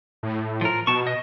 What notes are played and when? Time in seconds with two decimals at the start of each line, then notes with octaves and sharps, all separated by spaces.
0.23 A2
0.61 F3 A#4
0.87 B2 A5 C#6
1.07 D#5